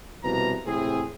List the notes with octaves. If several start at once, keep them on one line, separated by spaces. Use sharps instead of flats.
C2 B2 E3 F3 B4 A#5
A2 C3 E3 C4 G#4